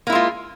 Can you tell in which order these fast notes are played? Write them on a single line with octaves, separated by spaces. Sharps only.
A#3 E4 G#3 F4